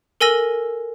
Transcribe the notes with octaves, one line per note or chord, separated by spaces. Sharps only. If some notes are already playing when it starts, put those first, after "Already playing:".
A4 A#4 G#5 E6 A#6 F#7